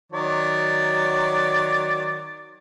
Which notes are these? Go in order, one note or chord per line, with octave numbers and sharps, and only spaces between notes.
D#3 F#3 D5